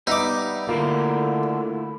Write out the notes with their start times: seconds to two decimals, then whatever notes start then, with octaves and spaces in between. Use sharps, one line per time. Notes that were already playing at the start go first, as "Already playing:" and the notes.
0.07 G3 B3 D#4 E5 D6
0.69 D3 A3 A#3 E4 F4